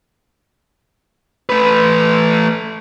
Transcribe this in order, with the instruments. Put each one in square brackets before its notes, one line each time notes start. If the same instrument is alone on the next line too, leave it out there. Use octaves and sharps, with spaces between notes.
[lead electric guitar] A3 B4